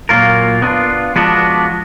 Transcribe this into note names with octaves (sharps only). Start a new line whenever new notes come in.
A#2 F#3 A#3 F4 A#4
B3 D4 F4
F3 G#3 B3 D4 F#4